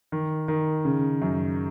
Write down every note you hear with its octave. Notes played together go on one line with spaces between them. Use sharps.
D#3
D#3
C#3
F#2